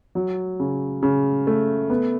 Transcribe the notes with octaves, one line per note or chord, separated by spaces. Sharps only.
F#3
C#3
C#3
A3
B3